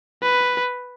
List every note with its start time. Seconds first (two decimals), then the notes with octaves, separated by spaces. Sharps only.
0.23 B4